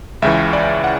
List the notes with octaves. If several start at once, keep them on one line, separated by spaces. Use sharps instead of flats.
C#2 C#3 E3 E5
D5
F#5